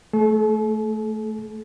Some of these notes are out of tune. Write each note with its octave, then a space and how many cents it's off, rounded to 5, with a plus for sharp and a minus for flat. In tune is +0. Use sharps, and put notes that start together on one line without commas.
A3 +0 A4 -45